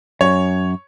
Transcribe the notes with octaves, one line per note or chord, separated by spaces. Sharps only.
F#2 C#5